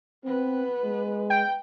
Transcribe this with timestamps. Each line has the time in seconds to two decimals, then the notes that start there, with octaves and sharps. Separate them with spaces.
0.24 B3 C4 B4
0.84 G#3
1.30 G5